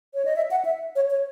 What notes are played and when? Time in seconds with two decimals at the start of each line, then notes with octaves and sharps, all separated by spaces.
0.14 C#5
0.25 D#5
0.36 E5
0.51 F#5
0.65 E5
0.96 C#5
1.10 C#5